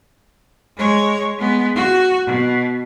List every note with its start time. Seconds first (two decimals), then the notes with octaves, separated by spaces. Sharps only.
0.77 G#3 C#5
1.38 G#3 B3
1.75 F#4
2.26 B2